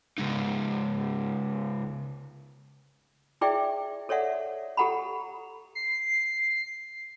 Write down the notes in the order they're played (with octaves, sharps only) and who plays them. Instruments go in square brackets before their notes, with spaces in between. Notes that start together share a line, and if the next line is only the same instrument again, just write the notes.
[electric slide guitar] C#3 G#3 D#4
[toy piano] E4 G#4 D5 E5 G5
A4 C#5 D5 E5 F#5
G4 A4 F#5 A#5 B5
[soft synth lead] C7